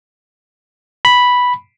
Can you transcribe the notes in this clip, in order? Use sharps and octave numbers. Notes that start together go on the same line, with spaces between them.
B5